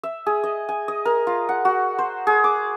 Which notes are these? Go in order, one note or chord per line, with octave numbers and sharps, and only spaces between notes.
E5
G#4
D#5
G#5
D#5
A#4
F4
F#5
F#4
C5
G#4
D6